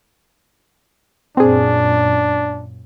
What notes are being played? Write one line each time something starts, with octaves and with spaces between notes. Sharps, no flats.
F#2 A#2 C4 D4 G#4